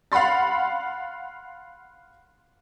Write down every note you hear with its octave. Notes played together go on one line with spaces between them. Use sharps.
F5 F#5 B5 C6 A6